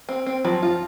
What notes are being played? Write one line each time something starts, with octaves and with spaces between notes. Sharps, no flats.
C4
C4
F3 F#3
F3 F4